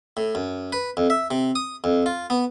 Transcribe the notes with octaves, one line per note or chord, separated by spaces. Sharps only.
A2
F#2
B4
F2
E5
C3
D#6
F2
F4
B3